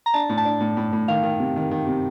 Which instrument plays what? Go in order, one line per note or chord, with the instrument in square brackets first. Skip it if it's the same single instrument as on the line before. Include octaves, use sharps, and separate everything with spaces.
[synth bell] A#5
[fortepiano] D4 [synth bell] A5
[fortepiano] A2
[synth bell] A5
[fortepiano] D4
A2
A2
A2
[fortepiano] D#3 [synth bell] F5
[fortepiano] D#3
C3
D#3
D#3
C3